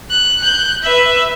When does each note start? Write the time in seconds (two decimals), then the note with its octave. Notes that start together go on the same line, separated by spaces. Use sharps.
0.10 F#6
0.42 F#6 G6
0.83 B4 E5